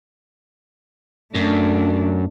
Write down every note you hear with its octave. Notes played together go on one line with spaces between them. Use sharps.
F#2 A3 D4